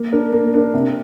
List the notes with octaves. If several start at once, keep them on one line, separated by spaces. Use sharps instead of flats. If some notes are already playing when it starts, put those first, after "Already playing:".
Already playing: A#3
D4 A#4
A#3
D4 A#4
C3